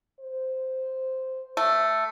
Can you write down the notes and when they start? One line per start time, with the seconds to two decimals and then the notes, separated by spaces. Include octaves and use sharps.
0.20 C5
1.57 A3